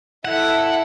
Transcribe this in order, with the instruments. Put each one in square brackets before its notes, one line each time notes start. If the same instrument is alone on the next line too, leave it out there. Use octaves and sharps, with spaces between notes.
[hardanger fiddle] E4 A4 [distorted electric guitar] F#5